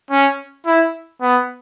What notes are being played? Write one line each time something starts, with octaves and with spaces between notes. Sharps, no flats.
C#4
E4
B3